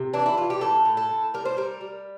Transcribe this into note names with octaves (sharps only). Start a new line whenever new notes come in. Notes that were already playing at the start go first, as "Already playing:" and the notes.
Already playing: C3
E3 D4
E4
E3 F4
G4
A2 A4
A2
A4
A2
G3 A#4
C5
G3 A#4
G3